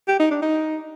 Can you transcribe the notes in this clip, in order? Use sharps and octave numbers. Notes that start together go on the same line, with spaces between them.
G4
D#4
D4
D#4